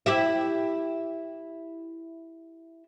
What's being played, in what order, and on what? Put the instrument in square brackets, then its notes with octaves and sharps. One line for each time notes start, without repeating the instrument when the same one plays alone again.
[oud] E4 G4 E5